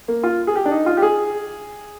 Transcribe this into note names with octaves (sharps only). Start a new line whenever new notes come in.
A#3
F4
G#4
G4
D4
D#4
F4
G4
G#4